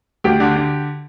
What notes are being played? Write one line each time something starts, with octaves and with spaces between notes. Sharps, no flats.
D2 G4
D3
D3